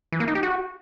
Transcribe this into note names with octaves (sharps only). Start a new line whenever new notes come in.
E3
A#3
D#4
G4
F#4